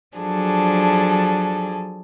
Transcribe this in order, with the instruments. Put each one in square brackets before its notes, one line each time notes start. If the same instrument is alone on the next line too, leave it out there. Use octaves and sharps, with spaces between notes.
[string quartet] F3 F#3 D4 G#4 A4